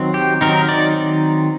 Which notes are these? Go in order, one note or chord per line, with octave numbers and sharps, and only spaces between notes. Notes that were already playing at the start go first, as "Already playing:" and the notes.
Already playing: D#3 F#3 C4
G4
D#3 F#3 C4 D#4 A#4
D5